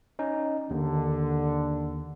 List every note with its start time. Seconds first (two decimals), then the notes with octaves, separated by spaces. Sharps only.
0.19 C#4 D#4
0.70 D#2 D3